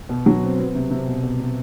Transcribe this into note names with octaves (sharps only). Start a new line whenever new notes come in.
B2
F#3
C4
B3
C3
C3
B2
B2
B2